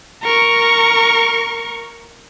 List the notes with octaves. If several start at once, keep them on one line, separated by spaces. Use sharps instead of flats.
A#4 C#6